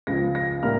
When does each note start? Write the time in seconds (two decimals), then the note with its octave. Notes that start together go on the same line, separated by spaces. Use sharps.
0.07 C#2 C#3 F3 A#6
0.35 A#6
0.63 A2 G3 A#3 F6